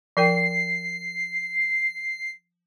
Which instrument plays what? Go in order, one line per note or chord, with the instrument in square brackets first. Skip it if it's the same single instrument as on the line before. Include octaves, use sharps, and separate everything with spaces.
[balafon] F3 A#4 G5 [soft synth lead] C7